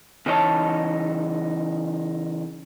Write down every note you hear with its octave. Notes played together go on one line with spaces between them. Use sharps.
C#3 E3 D#4 F#4 C#5 A5